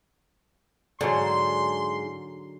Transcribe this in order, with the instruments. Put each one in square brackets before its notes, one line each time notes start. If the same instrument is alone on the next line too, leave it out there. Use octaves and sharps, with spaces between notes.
[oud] G#2 [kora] D3 F#3 [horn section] C6